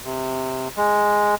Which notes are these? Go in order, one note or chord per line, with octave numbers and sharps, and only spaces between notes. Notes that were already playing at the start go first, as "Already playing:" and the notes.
C3
G#3